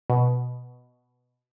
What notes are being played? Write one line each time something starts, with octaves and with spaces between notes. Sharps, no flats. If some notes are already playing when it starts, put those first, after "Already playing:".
B2